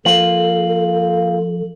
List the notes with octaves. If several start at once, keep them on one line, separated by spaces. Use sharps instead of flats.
F3 A#3 F4 A4 F#7